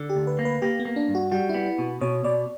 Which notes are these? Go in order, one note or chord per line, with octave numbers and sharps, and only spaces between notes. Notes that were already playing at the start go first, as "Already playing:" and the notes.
Already playing: D3
G4
D2
B4
A#3
B4
A#3 G4
B3
A#3
D4
G2
F#4
G3 F#4
E4
B3
E4
B2
B2 C#5
B2 D5